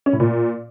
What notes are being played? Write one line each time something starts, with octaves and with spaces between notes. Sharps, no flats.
C#4
A2
A#2